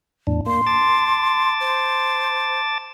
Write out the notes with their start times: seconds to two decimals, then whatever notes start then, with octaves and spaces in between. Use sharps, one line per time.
0.27 E2 A2 D4
0.46 A#3 C6
0.67 A5 D6 A6
1.60 C5